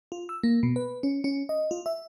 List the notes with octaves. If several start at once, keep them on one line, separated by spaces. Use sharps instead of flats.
F4
E6
A#3
B2
B4
C#4
C#4
D#5
F4
E5